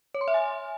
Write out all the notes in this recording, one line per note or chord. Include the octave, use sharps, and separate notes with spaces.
C#5
C6
E5
G#5